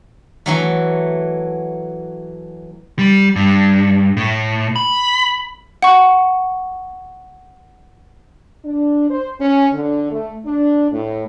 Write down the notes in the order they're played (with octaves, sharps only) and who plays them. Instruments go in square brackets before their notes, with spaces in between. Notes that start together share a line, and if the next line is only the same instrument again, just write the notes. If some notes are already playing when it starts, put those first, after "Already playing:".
[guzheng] E3 F#3 A3
[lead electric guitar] G3
G2
A2
B5
[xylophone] F#5 C#6
[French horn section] D4
C5
C#4
D3
A3
D4
A2